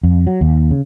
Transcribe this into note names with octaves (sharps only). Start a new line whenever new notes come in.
F2
F#3
D#2
C#3